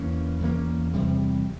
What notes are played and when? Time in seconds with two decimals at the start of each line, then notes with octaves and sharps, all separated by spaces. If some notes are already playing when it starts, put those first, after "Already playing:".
Already playing: E2 E3 A#3 C#4
0.41 E2 E3 A#3 C#4
0.94 E2 C3 G3